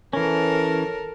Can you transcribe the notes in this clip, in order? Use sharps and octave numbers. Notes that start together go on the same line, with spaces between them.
E3 C#4 A4 A#4